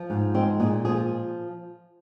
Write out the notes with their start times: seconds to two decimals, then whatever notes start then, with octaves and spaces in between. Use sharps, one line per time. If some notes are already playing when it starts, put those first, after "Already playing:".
Already playing: F3
0.10 G#2
0.34 G#3 C4
0.60 A#2 G#4
0.85 F3 G#4